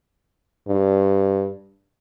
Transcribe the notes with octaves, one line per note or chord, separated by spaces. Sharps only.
G2